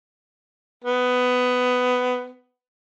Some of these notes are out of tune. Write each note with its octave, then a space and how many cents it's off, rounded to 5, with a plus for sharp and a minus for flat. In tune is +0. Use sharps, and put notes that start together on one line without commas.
B3 +15